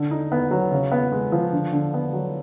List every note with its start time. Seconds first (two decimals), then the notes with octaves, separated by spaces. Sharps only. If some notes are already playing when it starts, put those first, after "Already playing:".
Already playing: D3
0.11 D#4
0.32 B3
0.51 F#3
0.72 C#3
0.92 B3
1.12 G#3
1.32 F3
1.53 D3
1.72 D3
1.94 B3
2.13 F#3